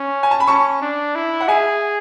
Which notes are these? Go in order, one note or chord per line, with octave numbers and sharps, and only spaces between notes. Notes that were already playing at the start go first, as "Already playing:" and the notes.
Already playing: C#4
G#5
A5
B5
C#4 A5 C#6
D4
E4
F#5
G#4 E5 G#5